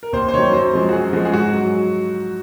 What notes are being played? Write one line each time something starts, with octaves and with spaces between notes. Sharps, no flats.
A#4
D#2 C5
C5
D#3 F#3 C#5
F#2 C5
F3 G#3
F#4
F#2 G#4
F3 G#3 F#4
G#4
G#2 F#4
F#3